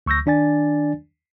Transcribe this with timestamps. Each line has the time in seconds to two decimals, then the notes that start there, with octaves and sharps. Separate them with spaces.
0.06 D2 C#6 E6 G6 A#6
0.26 D#3 D4 D5 G#5 A6